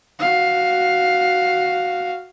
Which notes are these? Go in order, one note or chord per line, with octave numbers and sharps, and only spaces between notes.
F#4 F5